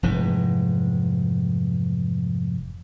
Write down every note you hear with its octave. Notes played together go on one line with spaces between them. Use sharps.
F1 G#2 E3